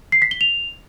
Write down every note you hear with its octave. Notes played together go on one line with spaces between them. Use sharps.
C7
B6
G7
F7